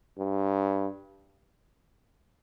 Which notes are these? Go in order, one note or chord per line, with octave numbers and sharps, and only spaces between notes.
G2